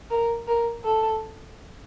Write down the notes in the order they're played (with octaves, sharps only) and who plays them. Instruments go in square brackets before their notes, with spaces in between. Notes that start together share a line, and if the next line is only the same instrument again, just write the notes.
[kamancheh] A#4
A#4
A4